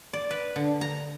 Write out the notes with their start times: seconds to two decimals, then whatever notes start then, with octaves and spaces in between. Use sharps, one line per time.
0.13 D5
0.31 B4
0.56 D3
0.81 A#5